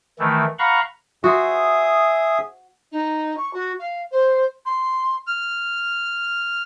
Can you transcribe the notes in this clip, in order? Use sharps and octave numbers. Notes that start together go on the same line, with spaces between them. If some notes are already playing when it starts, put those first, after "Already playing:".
D#3 E3 A3
F5 F#5 A#5 B5 C#6
F#4 G#4 C5 E5 D#6
D#4
C#6
F#4
F5
C5
C6
F6